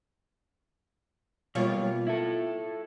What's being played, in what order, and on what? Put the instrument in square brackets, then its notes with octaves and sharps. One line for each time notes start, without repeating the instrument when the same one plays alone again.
[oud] B2 F4 C#5 [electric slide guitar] F#3 G3 A#3
[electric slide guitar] E4 A4